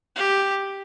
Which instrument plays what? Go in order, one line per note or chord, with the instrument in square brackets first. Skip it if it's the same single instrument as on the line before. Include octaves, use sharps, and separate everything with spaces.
[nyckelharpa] G4